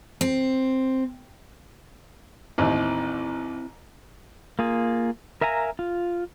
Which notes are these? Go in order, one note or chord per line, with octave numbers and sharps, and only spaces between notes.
C4
A1 D#2 C4 E4
A#3 F4 G#4
A#4 E5 F5 G#5 A#5
F4